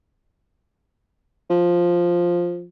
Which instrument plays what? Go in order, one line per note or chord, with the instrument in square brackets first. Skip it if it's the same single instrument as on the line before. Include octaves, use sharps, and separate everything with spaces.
[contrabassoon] F3